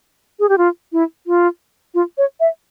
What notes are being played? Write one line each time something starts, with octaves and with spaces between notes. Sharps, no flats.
G#4
G4
F4
E4
F4
F4
C#5
E5